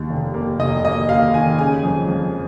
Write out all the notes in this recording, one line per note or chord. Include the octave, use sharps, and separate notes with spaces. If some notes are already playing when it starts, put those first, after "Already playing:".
Already playing: D#2 D#3
F1
A#3
F1 D#5
A#3 D#5
D#2 F5
D#3 G#5
C#3 G#5
F2
F2